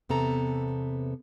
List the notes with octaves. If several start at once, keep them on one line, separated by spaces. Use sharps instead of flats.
E2 C3 B3 A4 A#5